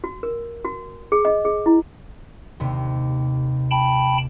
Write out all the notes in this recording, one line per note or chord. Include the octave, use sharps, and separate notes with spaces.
F#4
A#4
F#4
G#4
D#5
G#4
E4
D#2 C3
G5 A5 B5